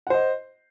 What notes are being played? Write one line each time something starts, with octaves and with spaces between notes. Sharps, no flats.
C5 D#5 F#5